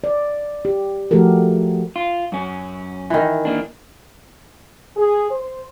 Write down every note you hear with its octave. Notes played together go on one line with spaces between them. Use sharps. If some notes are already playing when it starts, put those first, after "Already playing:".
D5
G4
F3 A3 F#4 G4 A4 A#4
F4
F#2 C#4
D#3 E3
A#3 D4
G#4
C5